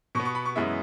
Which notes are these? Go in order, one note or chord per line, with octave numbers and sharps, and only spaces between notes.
B2 B3 C#6
C#6
B5
C#6
F#2 E3 G#3 B3 E5